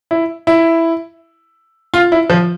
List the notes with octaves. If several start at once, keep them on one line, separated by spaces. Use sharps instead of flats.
E4
E4
F4
E4
F3